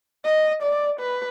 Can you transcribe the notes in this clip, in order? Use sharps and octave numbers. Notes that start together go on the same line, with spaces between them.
D#5
D5
B4